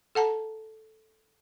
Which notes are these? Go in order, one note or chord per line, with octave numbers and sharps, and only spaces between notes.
A4 F#5 A5 A#5